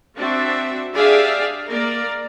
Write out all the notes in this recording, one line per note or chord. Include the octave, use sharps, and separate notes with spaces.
C4 D4 F#4 E5
D4 G4 G#4 D5 E5 F5
A#3 A#4 D5